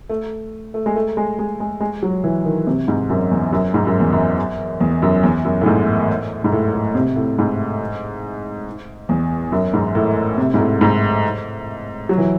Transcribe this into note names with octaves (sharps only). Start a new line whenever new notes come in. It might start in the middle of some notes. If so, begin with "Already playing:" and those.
A3
A3
G#3
A3
G#3
G#3
G#3
G#3
F#3
E3
D#3
C3
G#2
F#2
E2
F#2
G#2
F#2
E2
F#2
E2
F#2
E2
F#2
A2
G#2
G#2
A2
A2
C3
A2
G#2
E2
F#2
G#2
A2
C3
G#2
A2
G#2
F#3
E3